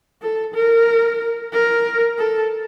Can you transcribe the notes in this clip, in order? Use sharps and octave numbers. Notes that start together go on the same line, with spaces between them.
A4
A#4
A#4
A4